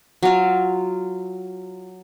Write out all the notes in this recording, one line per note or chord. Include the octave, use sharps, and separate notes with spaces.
F#3 F4